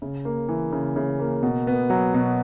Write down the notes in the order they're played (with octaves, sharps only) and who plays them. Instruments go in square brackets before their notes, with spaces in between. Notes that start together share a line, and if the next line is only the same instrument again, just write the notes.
[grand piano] C#3
A#3
E3
C#3
C#3
A#3
B2
B3
F#3
B2